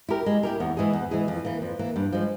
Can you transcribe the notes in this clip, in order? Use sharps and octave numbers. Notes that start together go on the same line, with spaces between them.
E4 G4 A#4
G#3
E4 G4 A#4
E2
E3 G#3 E4 G#4
E2
E3 G#3 E4 G#4
F2
E3 A#3
F2
E3 A#3
G2
F3 G#3